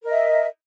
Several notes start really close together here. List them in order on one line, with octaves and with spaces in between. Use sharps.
A#4 D#5 E5